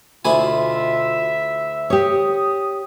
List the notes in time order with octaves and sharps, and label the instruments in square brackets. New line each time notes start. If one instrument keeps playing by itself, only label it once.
[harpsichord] D2 E4 G#5 [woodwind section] B2 F4 [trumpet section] E5
[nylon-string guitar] G4 C#5 [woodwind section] D#6